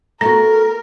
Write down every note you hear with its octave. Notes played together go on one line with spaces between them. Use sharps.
A3 B3 F#4 A#4 A#5 A#6